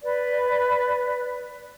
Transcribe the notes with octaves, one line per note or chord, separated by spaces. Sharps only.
B4 D5